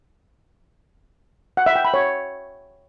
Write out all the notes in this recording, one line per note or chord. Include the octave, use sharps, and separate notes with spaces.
F#5
E5
G5
B5
C#5